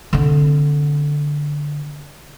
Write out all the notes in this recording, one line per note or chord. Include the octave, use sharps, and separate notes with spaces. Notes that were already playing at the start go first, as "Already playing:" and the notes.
D3 C4